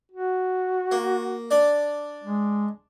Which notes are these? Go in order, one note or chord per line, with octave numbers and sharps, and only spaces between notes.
F#4
A#3
D4 D5
G#3